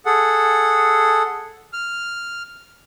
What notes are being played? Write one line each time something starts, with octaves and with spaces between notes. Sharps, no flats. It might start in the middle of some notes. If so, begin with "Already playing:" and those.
G#4 A4 F#5
F6